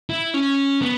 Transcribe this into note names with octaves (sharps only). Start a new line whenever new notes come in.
E4
C#4
B3